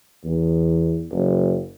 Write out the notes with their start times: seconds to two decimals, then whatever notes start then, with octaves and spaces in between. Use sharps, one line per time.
0.25 E2
1.11 F#1